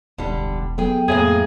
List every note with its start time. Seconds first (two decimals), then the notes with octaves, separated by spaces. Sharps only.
0.18 E1 C#2 D3 G3
0.78 F#3 B3 G#4 A4 G5
1.08 F2 A2 C3 A#3 G#4